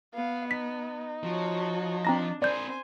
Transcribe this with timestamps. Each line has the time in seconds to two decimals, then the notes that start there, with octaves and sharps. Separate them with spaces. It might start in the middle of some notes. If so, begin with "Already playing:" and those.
0.14 B3 F5
0.51 D#4 B6
1.24 F3 F#4 C#5
2.05 C4 D4 A#5 A#6
2.42 C4 A#4 C5 D5 G#5 G6